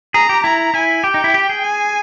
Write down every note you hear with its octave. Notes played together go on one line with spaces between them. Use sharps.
G#4 A#5
G4
E4 A#5
E4 G#5
G4 G5
D#4
E4
G4
G#4
G#5